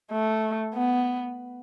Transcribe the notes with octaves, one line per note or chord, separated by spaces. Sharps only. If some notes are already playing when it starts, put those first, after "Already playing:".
A3
B3